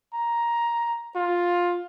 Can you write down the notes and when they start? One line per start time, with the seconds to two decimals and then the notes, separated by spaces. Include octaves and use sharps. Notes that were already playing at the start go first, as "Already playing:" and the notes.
0.13 A#5
1.16 F4